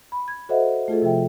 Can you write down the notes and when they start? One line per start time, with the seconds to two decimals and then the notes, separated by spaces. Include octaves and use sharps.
0.12 B5
0.28 G#6
0.49 F#4 A4 C5 D#5 E5 F#5
0.88 A3 F4 G#4 A4
1.02 C3 F3 E5 G5